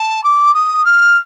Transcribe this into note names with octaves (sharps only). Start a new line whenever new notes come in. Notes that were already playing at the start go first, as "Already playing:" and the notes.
Already playing: A5
D6
D#6
F6